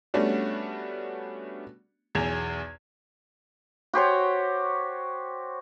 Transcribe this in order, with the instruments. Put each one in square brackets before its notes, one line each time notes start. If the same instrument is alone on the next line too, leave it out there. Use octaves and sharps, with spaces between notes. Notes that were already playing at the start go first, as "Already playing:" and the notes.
[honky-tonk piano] G3 A3 B3 C#4 D4 F#4
B1 E2 G#4 G#6 E7 F7
[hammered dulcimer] F#4 G4 C5 C#5